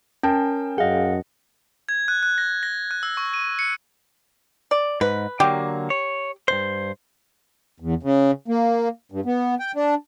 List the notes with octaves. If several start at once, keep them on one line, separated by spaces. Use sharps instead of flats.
C#4 A#4 G5 A5
F#2 G#4 D#5 F5 F#5
G#6
F#6
F#6
A#6
A#6
F#6
E6
C#6
D#7
C#7
D5
G#2 B4
D3 F#3 A#3 G4
C#5
G2 B2 C5
E2
C#3
A#3
G2
B3
G5
D4